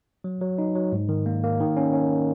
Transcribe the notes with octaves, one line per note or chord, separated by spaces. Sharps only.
F#3
F#3
D#4
F#3
G#2
D#3
A#3
A#3
D#3
C#4
C#4